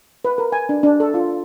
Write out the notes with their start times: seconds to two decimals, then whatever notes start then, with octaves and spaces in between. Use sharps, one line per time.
0.25 B4
0.38 A#4
0.52 G#5
0.69 D4
0.83 D4
1.00 A4
1.14 F4